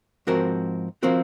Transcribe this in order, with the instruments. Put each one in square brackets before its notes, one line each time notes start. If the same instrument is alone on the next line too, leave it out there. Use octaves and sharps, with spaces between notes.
[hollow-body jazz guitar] G#2 F3 C4 F#4 A#4
F3 C4 F#4 A#4